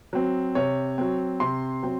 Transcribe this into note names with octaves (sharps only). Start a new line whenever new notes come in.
F#3 C4
C3 C#5
F#3 C4
C3 C6
F#3 C4